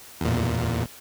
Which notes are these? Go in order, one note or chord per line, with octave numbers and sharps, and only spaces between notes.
E2 A#2